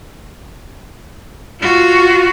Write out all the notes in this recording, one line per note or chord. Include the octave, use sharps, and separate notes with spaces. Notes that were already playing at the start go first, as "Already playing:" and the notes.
F4 F#4